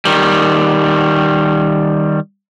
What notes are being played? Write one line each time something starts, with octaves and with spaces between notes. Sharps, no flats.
D#3 G3